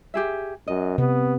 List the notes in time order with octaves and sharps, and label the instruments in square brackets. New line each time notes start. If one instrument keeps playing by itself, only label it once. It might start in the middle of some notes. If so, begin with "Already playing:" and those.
[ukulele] G4 G#4 E5
[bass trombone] F#2 [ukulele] D#5
[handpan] C3 [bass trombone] B3